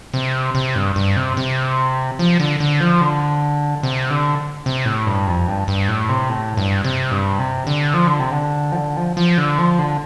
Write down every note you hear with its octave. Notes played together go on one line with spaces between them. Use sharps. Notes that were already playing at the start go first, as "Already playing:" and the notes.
C3
C3
G2
G2
C3
C3
F3
D3
D3
F3
D3
C3
D3
C3
A2
G2
F2
G2
G2
A2
C3
A2
G2
C3
G2
C3
D3
F3
D3
C3
D3
F3
D3
F3
F3
D3
F3
D3